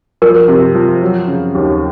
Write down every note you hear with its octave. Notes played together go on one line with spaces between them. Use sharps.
F3 A#4
C3
F3
F#3
C#3
D#2